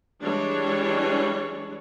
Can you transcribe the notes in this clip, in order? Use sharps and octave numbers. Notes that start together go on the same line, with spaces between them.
E3 G3 G#3 D4 C#5